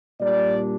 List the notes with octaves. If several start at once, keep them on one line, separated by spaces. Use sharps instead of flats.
A#2 G3 D4 D5